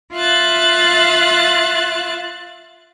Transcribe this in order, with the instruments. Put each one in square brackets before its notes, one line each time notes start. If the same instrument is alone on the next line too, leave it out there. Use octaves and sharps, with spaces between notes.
[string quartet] F4 E5 F#6 A6